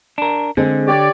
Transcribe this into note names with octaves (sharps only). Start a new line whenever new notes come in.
D4 A#4
D3 G#3 C4 G#4
G4 C#5 D5